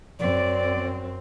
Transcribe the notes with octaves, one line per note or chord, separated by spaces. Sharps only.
F#2 C4 D5